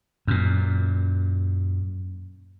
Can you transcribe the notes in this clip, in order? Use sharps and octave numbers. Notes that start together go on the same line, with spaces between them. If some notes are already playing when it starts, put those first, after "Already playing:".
F#2 A#2